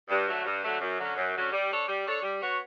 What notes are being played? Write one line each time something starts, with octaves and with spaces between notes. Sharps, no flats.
G2
D3 F#3 A3
G2
D3 F#3 A3
F#2
D3 F#3 C#4
F#2
D3 F#3 C#4
G3
D4 A4 C#5
G3
D4 A4 C#5
G3
B3 F#4 C#5